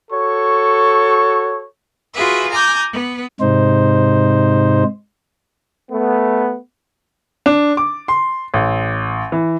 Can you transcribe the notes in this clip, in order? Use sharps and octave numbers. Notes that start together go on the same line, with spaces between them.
F#4 A4 C#5 C#6
F4 F#4 G#4 B4 E5
G#5 A#5 D6 G6
B3 B4
G#2 C3 D#4 C5
A3 B3
D4
D6
C6
A1
E3